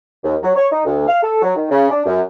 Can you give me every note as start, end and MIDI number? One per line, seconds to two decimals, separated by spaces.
0.24 0.36 39
0.43 0.51 54
0.56 0.67 73
0.72 0.85 63
0.85 1.04 38
1.07 1.18 77
1.22 1.40 69
1.42 1.53 54
1.56 1.69 51
1.70 1.88 49
1.90 2.02 62
2.06 2.21 42